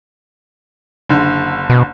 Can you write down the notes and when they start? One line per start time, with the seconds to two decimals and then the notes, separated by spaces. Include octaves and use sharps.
1.09 F#1 D3
1.70 B2